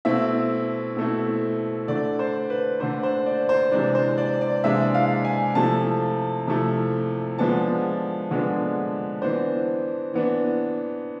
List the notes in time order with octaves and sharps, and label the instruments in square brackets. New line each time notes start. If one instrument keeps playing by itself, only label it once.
[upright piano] B2 A3 C4 E4 E5
B2 A3 C4 E4
D3 A3 D4 D5
C5
B4
D3 A3 D4 C5
C5
D5
C5
C3 E3 G#3 D4 D5
C5
D5
D5
C3 E3 G#3 D4 E5
F5
G#5
C3 F3 A3 E4 A5
C3 F3 A3 E4
D3 F3 G#3 B3 D4 A5
D3 F3 G#3 B3 D4
E3 B3 D4 C5
E3 B3 D4